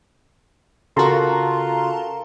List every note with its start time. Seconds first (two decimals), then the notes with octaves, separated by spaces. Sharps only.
0.97 C#3 F4 F#4 A4 A#4 A5 A#5 C6